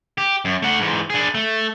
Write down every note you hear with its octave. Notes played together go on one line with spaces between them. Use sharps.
G4
F#2
A3 F#5
G#2 E3
D4 G#4
A3